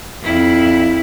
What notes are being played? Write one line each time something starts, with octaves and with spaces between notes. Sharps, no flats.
F2 E4